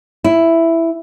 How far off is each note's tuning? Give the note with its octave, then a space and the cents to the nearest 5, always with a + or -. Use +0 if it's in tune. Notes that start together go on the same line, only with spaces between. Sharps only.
E4 +5